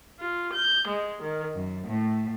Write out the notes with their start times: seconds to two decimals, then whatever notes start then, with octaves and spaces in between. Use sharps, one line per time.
0.19 F4
0.51 G6
0.86 G#3
1.21 D#3
1.55 F#2
1.87 A2